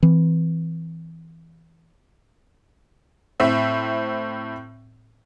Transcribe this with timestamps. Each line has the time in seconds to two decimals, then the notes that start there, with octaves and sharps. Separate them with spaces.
0.03 E3 C4
3.40 A2 C4 E5